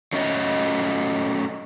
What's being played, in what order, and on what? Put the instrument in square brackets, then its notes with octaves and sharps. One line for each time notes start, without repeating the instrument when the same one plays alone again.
[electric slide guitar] F#3 A3 C#4 C#5 D#5